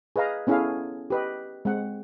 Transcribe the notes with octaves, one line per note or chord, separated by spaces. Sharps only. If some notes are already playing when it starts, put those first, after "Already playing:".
G#4 B4 D#5 F5 A#5
B3 C#4 E4 G#4 A4 F5
G4 B4 D#5
G#3 C4 F#5